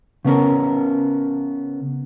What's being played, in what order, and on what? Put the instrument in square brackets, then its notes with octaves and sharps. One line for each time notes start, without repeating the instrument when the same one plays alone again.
[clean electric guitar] C#3 B3 C#4 A#4